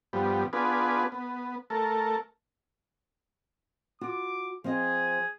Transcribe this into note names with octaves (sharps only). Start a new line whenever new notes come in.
G2 F3 G3 B3
B3 D4 F4 G#4 B4
B3
A3 A4 A#4
F4 F#4 D6
F3 C4 G#4 D#5